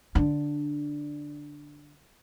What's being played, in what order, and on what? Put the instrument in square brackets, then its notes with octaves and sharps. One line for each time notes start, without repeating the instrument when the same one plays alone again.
[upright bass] D3 D4